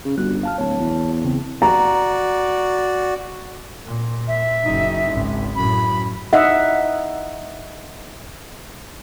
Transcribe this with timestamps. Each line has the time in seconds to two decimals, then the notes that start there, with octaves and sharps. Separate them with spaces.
0.05 C#3
0.18 G1 G3 F#4 F#6
0.43 F5 A5 F6
0.58 D1 C#5 A5
0.80 E2
1.24 C#3 C4
1.62 F#4 D5 A#5
3.85 A#2
4.28 E5
4.64 F#1 D#4
5.09 G#1 C#2
5.56 F#2 A2 B5
6.33 D#4 D#5 E5 F#5